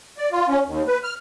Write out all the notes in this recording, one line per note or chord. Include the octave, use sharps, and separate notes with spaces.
D5
F4
C#4
D#2
B4
F6